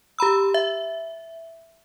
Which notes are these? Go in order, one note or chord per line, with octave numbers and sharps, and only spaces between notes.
G4 A#5 B5 E6
E5